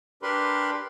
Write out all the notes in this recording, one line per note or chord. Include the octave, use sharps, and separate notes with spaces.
D4 G4 A#4 B4 B5 C6